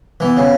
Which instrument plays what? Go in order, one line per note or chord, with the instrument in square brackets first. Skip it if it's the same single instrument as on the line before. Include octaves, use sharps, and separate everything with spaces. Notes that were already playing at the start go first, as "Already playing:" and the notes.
[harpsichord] E3 [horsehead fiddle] B3
[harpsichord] C#3